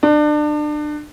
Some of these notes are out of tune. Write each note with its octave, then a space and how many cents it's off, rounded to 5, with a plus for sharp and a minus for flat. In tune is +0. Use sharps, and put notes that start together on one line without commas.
D4 +30